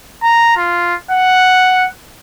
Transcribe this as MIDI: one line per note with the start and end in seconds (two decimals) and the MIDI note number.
0.23 0.56 82
0.57 0.94 65
1.11 1.87 78